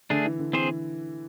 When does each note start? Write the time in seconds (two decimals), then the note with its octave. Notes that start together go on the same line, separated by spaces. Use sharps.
0.10 D3 A3 D4 G#4
0.25 E3
0.39 D3
0.53 E3 C4 G#4 C5